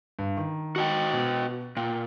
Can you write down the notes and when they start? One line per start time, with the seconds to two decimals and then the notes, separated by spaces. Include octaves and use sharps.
0.19 G2
0.37 D#3
0.76 F#4 D#5 G5
1.13 B2
1.77 A#2 G5